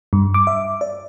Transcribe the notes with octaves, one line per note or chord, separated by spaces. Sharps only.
G2
D6
E5
D5